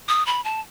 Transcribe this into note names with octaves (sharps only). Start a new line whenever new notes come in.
D#6
B5
A5